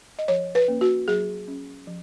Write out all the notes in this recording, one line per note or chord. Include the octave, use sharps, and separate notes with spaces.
D#5
F3 C#5
B4
A#3 C#4
F#4
F#3 G#4
C#4
F3